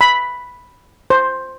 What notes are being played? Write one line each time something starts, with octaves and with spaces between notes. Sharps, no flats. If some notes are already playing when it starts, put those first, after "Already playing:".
B5
C5